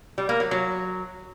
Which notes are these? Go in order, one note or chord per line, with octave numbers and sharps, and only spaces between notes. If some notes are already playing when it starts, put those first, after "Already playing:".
G3
A#3
F#3
F#3